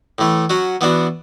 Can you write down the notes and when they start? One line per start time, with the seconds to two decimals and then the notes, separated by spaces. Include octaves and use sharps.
0.18 A2 E3 A3
0.50 F#3 C#4 F#4
0.81 E3 B3 D4 F#4